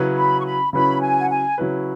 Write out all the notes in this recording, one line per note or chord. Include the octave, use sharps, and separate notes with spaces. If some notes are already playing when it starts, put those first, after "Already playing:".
Already playing: C#3 F#3 C#4 E4 B4
B5
C#6
B5
C#3 F#3 C#4 E4 B4 B5
G#5
F#5
G#5
C#3 F#3 C#4 E4 B4